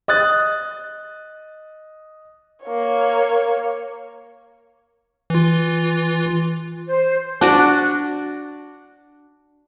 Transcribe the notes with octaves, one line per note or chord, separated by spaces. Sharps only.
D#5 D#6 F#6 A6
A#3 C#5
E3 F4
C5
D4 F#4 D5